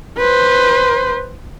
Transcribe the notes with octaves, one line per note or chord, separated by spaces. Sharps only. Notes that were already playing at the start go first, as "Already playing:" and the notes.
B4 C5